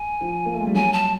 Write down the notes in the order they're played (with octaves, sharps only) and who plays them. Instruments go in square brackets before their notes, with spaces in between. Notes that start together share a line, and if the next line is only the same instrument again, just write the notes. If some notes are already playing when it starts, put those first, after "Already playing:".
Already playing: [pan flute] G#5
[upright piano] F3
A#3
A3
G#3
G3
[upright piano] F#3 [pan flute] G#5
[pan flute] A5